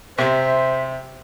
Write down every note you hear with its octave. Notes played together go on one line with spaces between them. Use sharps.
C3 C5 E5